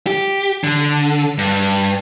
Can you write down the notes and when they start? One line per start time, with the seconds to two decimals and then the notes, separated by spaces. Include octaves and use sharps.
0.07 G4
0.64 D3
1.38 G2